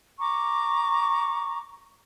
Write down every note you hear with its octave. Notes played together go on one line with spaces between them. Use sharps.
A#5 C#6 D6